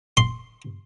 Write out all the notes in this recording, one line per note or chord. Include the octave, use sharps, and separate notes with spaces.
C6